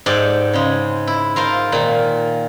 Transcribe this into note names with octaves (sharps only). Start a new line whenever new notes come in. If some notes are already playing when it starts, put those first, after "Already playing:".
G#2 G4 A4 D5
C#3 G#3
E4
F4 A#4 C5 F5
A#2 D#3